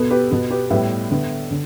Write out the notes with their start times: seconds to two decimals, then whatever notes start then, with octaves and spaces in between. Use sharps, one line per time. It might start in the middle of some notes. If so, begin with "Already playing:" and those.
Already playing: B2 B3 A4
0.10 G4 B4
0.31 B2 B3
0.51 G4 B4
0.70 A2 G3 B3 B4 E5
1.11 D3 B3
1.51 D3